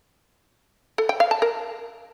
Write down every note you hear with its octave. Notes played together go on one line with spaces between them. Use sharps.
A4
G5
F5
A5
A#4